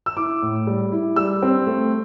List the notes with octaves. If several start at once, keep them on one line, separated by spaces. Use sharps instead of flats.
E6
E4 D6
A2
G3
E4
G3 E6
C4
A3